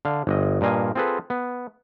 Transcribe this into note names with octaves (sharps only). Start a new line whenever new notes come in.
D3 F5
G1 D#5
G2 A#2 D#5 F5 G#5
C4 F4 G#4 A4 B4
B3